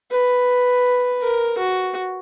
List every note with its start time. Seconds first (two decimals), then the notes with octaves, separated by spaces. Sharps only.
0.11 B4
1.22 A#4
1.58 F#4